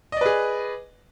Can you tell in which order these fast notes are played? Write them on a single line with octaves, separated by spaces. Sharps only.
D#5 D5 B4 G#4